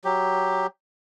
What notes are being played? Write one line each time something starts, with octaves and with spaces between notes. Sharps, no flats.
F#3 G4